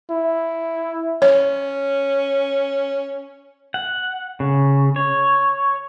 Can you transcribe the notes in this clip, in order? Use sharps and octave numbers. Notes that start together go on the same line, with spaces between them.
E4
C#4 C#5
F#5
C#3
C#5